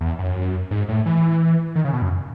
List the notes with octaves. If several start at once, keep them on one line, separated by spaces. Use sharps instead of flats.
E2
F#2
G#2
A2
E3
D#3
C#3
B2
F#2